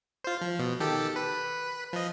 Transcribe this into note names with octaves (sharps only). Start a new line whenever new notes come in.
F4 C5
F3
B2
D#3 G4 A4
B4
F3 D#5